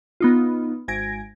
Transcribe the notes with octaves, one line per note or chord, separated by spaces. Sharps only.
B3 D#4 F4
G#1 G#5 G#6 A#6 D7